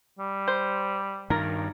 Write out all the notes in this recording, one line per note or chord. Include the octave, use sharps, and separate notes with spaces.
G3
C5
G2 D#3 A#4